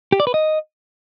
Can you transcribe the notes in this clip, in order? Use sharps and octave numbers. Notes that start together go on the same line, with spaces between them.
G4
D5
B4
D#5